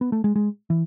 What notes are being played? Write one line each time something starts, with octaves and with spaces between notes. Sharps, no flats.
B3
A3
G#3
G#3
E3